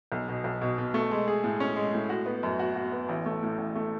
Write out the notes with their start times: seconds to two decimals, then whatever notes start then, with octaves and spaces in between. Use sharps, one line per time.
0.12 B1
0.28 B2
0.44 B1
0.62 B2
0.78 B2
0.94 A3
1.11 G#3
1.28 G#4
1.44 A2
1.60 C#4
1.76 G#3
1.94 A2
2.09 F#4
2.26 B3
2.43 F#2
2.59 F#4
2.75 F#4
2.92 B3
3.09 A1
3.26 A3
3.43 A2
3.58 A1
3.75 A3